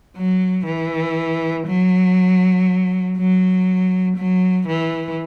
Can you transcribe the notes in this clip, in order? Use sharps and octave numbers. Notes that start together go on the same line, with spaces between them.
F#3
E3
F#3
F#3
F#3
E3